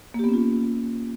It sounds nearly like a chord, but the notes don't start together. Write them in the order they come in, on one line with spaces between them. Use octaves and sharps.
A#3 G4 B3 C#4 F4